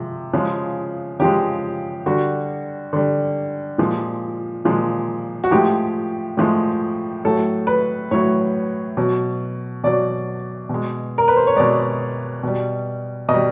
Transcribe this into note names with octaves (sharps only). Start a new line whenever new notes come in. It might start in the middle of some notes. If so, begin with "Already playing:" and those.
Already playing: C3 F3 G#3
C#3 F3 G#3
C#3 F3 G#3 G4
D3 G3 F#4
D3 G3
A#2 F3 G#3
A#2 F3 G#3
F#4
A2 F3 G#3 G4
A2 F3 G#3
A2 F#3 A4
B4
A2 F#3 C#5
B2 F#3
B2 F#3 D5
B2 G#3
A#4
B4
C5
C#5
B2 G#3 D5
B2 G3
B2 D#5
G3